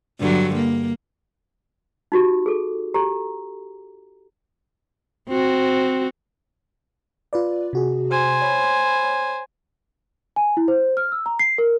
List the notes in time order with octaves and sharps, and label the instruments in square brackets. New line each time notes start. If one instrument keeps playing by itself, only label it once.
[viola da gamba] G2 D3 F#3
A#3
[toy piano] D#4 F#4 G4
G#4 A4
G4 A4 A#5
[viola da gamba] C4 F#4
[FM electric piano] F4 B4 D5
C3 F#4 G#4
[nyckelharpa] C5 G#5
[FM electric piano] C#5 B5
[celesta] G#5
E4
C5
F6
E6
A#5
C7
A#4